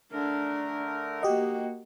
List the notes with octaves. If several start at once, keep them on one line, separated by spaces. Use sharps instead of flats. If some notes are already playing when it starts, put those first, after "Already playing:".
D3 A3 D4 A#4
A#3 F#4 G4 D#5